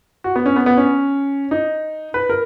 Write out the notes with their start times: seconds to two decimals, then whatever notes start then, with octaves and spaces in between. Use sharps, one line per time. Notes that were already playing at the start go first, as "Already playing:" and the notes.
0.24 F#4
0.36 B3
0.46 C#4
0.56 B3
0.66 B3
0.77 C#4
1.51 D#4
2.14 B4
2.29 A#4